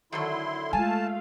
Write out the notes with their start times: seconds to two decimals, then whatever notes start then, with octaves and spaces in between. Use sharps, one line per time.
0.12 D3 D#3 F#3 E4 A4 C6
0.73 G#3 A3 F4 F5 G#5 A5